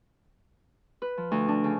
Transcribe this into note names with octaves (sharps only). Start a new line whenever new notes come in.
B4
F3
D2
D4
C#3